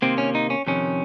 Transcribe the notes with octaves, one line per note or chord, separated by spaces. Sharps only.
C3 D#3 A#3 C4
C#4
D#4
C#4
F2 C3 D#3 C#4